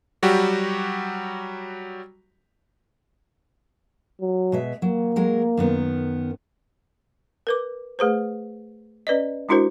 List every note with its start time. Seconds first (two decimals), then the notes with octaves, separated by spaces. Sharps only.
0.23 F#3 G3 F#4 G4
4.21 F#3
4.52 B2 G#3 E5
4.82 F#3 A#3
5.16 F#3 G#3 A#4
5.57 F#2 D#3 B3
7.47 A#4 B4 D6
7.99 A3 G#4 B4 C5
9.07 C#4 B4 D5 D#5
9.49 G#3 D4 E4 F#4 A#4 C5